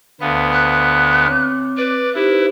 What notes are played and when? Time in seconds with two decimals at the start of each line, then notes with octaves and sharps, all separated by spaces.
0.20 D2 B3 B4 F5 A5
0.53 F#6
1.27 C4 C#5 D6
1.77 B4 D5
2.15 D#4 E4 G4 C5